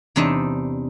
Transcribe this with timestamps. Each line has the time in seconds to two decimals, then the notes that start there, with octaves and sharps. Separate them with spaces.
0.16 E2 C3 D4 D#4 E5